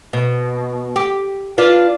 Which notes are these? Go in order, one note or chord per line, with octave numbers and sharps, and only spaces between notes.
B2
G4
D4 F4 B4